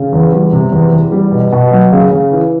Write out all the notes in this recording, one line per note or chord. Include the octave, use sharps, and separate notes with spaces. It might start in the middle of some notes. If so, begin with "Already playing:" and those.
Already playing: C#3
E2
G3
C3
E2
E2
G3
B2
B2
F#3
C#3
C#3
E3